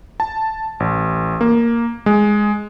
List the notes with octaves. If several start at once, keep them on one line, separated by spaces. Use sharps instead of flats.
A5
A1
A#3
G#3